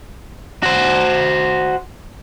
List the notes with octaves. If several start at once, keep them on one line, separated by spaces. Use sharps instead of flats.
F#4 C5